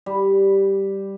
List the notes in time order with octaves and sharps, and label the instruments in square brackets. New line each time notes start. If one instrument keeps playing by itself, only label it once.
[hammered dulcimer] G3